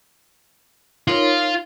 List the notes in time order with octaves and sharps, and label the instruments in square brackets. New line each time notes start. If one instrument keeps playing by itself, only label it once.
[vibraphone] D#4 A#4 C#5 [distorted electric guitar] F4